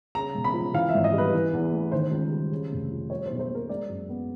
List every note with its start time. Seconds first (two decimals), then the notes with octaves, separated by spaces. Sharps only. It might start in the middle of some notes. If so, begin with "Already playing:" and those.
0.15 C#3 A#5
0.34 E1
0.44 B5
0.54 F3
0.74 E3 F5
0.89 E5
0.94 G#1
1.04 D#5
1.13 G3
1.18 B4
1.33 E3
1.53 E2
1.73 A3
1.92 D#3 C5
2.11 C#2
2.31 G3
2.51 C#3
2.72 F1
2.91 F3
3.10 G3 C#5
3.26 C5
3.31 B1
3.39 C5
3.50 A#3
3.55 A#4
3.69 G#3 D5
3.89 F#2
4.09 B3